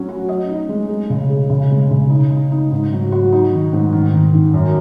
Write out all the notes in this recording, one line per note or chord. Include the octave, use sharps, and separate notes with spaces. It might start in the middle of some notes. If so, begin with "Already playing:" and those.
Already playing: F#3 C#4
F#4
D#5
D#4
G#3
G#4
C#3
G#4
C#3
G#3
C#3
D#4
D#4
D#4
G#2
F#3
F#4
D#4
D#3
G#2
D#3
D#3
D#3
F#2